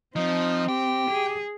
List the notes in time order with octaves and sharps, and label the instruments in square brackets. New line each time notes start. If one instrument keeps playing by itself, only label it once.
[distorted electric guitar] F3 [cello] C4 [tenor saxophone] D#4
[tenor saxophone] G4 [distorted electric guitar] G5
[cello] G#4